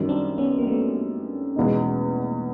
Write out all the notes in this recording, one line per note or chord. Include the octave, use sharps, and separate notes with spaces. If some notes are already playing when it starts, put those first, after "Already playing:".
Already playing: F#2 D#3 G3
C4 D4
B3 C#4
A#3
A3 B3
E2 B2 G#3 B3 D#4